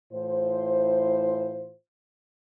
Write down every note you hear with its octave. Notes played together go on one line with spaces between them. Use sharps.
A2 E3 F4 C5